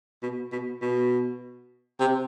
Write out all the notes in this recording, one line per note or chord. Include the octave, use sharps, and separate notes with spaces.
B2
B2
B2
C3